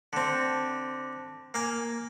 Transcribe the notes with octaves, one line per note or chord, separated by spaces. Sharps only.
D3 C4
A#3 F5 G#5